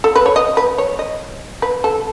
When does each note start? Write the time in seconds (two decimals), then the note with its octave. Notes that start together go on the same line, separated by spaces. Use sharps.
0.04 A4
0.16 B4
0.26 C#5
0.36 D#5
0.57 B4
0.78 C#5
0.99 D#5
1.62 B4
1.84 A4